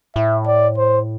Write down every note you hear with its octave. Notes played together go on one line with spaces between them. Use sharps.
A2 E5
D5
C5